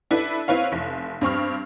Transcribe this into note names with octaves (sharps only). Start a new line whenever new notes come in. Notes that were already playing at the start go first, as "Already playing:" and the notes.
D4 E4 A4 B4 E5
C4 E4 B4 C#5 F5
F1
G2 C4 C#6 F6